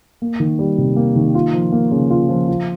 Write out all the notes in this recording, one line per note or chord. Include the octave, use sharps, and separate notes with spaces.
A#3
D#3
G3
C3
A#3
D#3
F4
F3
A#3
C#3
F4
F3
F4